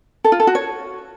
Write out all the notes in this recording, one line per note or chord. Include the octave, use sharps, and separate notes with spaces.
A4
F4
A4
F#4
C#5